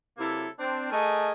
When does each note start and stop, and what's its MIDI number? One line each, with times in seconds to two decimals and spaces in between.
0.18 0.47 48
0.18 0.47 54
0.18 0.47 58
0.18 0.47 64
0.18 0.47 69
0.59 0.87 60
0.59 0.87 62
0.91 1.31 57
0.91 1.31 68
0.91 1.31 70
0.91 1.31 75
0.91 1.31 80